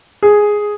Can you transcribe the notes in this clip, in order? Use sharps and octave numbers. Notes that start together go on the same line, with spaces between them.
G#4